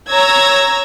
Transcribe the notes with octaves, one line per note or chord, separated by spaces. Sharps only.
C#5 A#5 E6 G#6 A#6